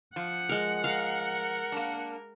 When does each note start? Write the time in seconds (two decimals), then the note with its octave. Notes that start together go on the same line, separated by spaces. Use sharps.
0.16 F3 F#5
0.49 G#3 A#4
0.84 A#4 F5 A#5
1.72 A#3 D4